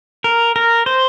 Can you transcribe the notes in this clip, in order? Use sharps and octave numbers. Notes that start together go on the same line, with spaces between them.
A#4
A#4
C5